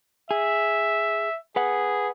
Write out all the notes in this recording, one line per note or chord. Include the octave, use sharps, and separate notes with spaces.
G#4 E5
G#4 B4 F#5